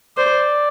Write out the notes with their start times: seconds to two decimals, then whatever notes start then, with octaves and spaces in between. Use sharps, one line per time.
0.17 C5 D5